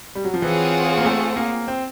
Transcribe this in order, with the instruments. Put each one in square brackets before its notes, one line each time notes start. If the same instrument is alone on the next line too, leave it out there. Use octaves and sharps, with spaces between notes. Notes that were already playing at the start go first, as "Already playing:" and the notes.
[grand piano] G3
F#3
F3
[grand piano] E3 [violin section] C4 F4 G#4 C#5 F#5
[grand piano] A#3
A3
A#3
C4